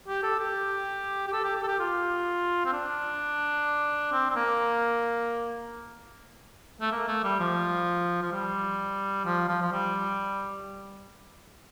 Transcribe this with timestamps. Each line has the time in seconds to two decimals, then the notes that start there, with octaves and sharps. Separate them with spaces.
0.08 G4
0.23 A4
0.39 G4
1.28 G4
1.33 A4
1.44 G4
1.56 G4
1.63 A4
1.67 G4
1.80 F4
2.65 C4
2.73 D4
4.12 C4
4.30 C4
4.36 A#3
6.81 A3
6.92 A#3
7.08 A3
7.24 G3
7.39 F3
8.22 F3
8.32 G3
9.25 F3
9.48 F3
9.62 F3
9.72 G3